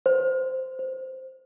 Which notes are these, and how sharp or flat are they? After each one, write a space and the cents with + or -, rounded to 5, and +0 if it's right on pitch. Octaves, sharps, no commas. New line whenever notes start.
C5 -10
C5 -5